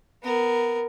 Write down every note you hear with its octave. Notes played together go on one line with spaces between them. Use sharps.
B3 A#4